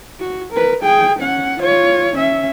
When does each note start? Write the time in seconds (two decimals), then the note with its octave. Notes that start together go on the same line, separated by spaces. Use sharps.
0.20 F#4
0.53 A#4 B4
0.83 G#4 G5
1.19 C#4 F#5
1.60 F4 C#5
2.16 C#4 E5